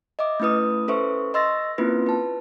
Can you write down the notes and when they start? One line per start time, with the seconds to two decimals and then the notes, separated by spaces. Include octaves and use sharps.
0.19 D#5 E5 D6
0.40 A3 C#4 E4 B4 D#6
0.88 C#4 A4 B4 C5 E5 C#6
1.34 D#5 C6 E6 A6 A#6
1.78 A#3 C4 C#4 E4 F4 B4
2.06 B4 A5